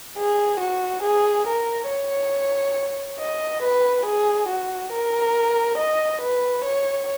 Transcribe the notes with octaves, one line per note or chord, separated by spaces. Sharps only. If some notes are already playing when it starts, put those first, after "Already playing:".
G#4
F#4
G#4
A#4
C#5
D#5
B4
G#4
F#4
A#4
D#5
B4
C#5